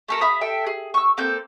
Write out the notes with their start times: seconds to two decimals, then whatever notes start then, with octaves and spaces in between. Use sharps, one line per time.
0.08 A3 A4 A#4
0.21 E5 F5 B5 D#6
0.41 A4 E5 G5
0.67 G#4
0.94 C#6 E6
1.17 A#3 C4 A4 G6